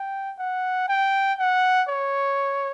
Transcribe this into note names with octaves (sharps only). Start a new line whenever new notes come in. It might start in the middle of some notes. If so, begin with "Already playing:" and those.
Already playing: G5
F#5
G5
F#5
C#5